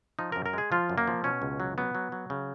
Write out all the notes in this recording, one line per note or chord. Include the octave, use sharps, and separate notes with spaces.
F3 D#4
F#2 A#4
A#4
G#3 G#4
F3 F4
F#2
A#3
F3
B2 C#4
C#2
F#3
F#3 B3
F#3
F#3
C#3